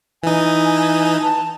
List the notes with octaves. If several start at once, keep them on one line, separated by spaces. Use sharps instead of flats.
E3 D#4 G#5
A5